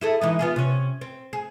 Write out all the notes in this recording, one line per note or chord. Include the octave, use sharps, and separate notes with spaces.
E4 G#4 A4
E3 G#3 D#4
B3 F4 G#4
C3 C#4
C4
G#4